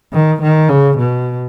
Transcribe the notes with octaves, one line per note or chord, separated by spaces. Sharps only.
D#3
D#3
C#3
B2